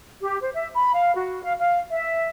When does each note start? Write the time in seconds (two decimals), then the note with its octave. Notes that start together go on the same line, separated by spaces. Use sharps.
0.22 G4
0.41 C5
0.53 E5
0.75 B5
0.93 F5
1.14 F#4
1.42 F5
1.59 F5
1.89 E5